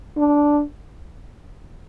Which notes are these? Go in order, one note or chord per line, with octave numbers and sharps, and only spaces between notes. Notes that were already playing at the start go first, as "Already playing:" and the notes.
D4